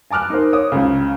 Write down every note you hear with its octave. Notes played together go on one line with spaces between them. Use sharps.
G#5 A5 D6 F6 F#6
D#4 A#4 C5
C5 C#5 D6 D#6
C#2 C#3